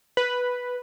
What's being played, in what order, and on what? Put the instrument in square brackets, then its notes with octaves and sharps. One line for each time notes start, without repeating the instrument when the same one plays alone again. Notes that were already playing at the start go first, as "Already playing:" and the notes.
[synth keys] B4